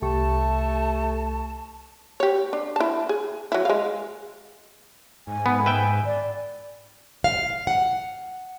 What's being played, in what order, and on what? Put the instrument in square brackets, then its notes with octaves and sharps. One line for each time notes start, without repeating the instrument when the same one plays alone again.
[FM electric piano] C2 G4 C#6 [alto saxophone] A3 [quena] A5
[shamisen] G4 C#5
D4
E4 A5
G#4
F#3 E4
G#3 F5
[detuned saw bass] G#2 [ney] G#5
[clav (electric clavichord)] B3
B4 E5 G5
[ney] D5
[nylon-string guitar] F5
F#5